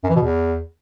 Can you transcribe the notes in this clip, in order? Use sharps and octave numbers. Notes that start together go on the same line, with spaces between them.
F#2
E3
B2
E2